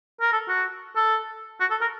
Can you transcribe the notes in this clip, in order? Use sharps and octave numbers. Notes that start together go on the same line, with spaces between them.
A#4
A4
F#4
A4
F#4
A4
A#4